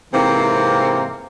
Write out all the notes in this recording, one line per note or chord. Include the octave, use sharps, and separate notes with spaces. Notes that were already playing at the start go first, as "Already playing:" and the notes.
G#2 C3 E3 A#3 C4